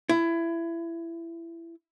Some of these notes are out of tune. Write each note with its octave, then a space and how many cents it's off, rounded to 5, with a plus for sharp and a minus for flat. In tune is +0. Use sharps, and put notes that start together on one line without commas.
E4 +20